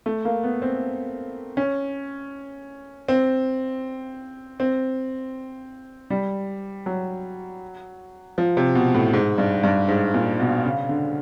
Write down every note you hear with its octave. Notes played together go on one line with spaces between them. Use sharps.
A3
A#3
B3
C4
C#4
C4
C4
G3
F#3
F3
C3
B2
A2
G#2
G2
G2
G#2
A#2
B2
C#3
D3